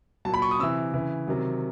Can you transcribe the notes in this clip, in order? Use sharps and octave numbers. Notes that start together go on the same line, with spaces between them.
A#2 F#3 A5 B5
C#6
D#6
C3 E3 E6
C#3 E3
C3 D#3 F#3